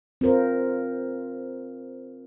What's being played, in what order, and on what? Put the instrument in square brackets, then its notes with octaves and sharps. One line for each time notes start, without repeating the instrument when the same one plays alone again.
[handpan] C4 F4 A#4 C5